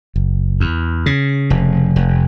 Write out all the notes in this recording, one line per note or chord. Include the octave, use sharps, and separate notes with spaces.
F#1
E2
C#3
F1
F1